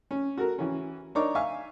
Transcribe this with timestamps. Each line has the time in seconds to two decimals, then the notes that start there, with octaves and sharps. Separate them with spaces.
0.11 C#4
0.38 F#4 A4 A#4
0.59 E3 C#4
1.15 D4 D#4 A#4 C#5 D6
1.35 E5 F5 G#5 C#6